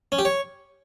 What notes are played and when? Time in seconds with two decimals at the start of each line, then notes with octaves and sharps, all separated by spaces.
0.12 C#4
0.19 G4
0.25 C#5